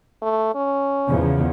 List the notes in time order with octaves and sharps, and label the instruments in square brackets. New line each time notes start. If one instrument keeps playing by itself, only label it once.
[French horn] A3
C#4
[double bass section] E2 C#3 F3